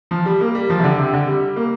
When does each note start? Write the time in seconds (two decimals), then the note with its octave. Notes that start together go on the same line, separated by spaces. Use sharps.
0.11 F3
0.26 G3
0.41 A#3
0.55 G3
0.70 F3
0.80 C3
0.84 D3
0.99 C3
1.13 D3
1.28 G3
1.56 A#3